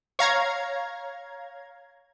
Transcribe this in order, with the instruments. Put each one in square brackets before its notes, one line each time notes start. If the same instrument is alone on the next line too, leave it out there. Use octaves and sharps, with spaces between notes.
[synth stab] C#5 F5 A#5 G#6